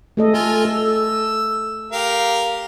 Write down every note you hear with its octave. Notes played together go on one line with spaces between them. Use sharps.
A3 A4 D#5
F4 A4 G#5
A4 E6
G4 A#4 F5